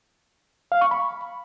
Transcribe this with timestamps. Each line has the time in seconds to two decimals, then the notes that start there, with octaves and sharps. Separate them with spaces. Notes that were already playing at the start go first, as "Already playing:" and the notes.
0.72 F5
0.81 C#6
0.91 B5